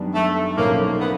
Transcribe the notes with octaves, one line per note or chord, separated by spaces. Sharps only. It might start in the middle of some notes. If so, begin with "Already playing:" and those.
Already playing: F#2 D#3 G3 B3 D4
A3
B1 A2 F3 A3 A#3 C#4
B3